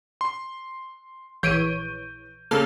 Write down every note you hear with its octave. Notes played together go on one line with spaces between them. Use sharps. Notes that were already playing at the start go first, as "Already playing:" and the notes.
C6
A#1 E3 C#5 G6 D7 D#7
C#3 A#3 A4 A5 F6